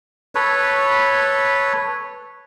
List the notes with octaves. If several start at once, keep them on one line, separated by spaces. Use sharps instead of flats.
A4 B4 C#5